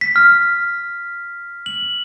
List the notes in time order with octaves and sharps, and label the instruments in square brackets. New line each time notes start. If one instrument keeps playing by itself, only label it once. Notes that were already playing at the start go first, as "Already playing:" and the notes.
[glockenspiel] B6
F6
F#7